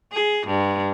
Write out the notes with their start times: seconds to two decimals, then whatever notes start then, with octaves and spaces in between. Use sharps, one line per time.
0.12 G#4
0.47 G2